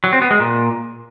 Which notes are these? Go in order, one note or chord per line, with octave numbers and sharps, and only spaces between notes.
F#3
C4
B3
G#3
A#2